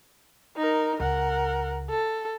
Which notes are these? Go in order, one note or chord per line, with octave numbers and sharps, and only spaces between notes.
D#4 A#4
C#2 A#4 F#5
A4